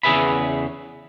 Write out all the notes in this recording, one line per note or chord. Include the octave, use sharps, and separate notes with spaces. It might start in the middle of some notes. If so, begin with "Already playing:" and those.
E2 C#3 G#4 B4 E5 B5